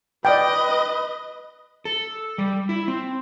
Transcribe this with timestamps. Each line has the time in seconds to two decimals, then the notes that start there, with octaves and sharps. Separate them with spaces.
0.25 B4 D5 D#5 G5
1.85 A4
2.38 G3
2.69 E4
2.88 C4